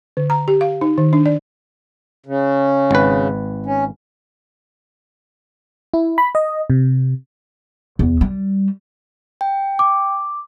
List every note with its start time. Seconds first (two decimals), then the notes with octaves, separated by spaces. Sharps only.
0.17 D3
0.30 A#5
0.48 G4
0.61 F5
0.81 D#4
0.98 D#3
1.13 D4
1.26 D5
2.26 C#3
2.91 G#1 B4
3.66 C#4
5.94 E4
6.18 B5
6.35 D#5
6.70 C3
7.99 E2
8.21 G3
9.41 G5
9.79 D6